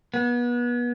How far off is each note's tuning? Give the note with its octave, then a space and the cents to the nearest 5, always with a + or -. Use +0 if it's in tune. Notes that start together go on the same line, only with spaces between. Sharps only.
B3 -30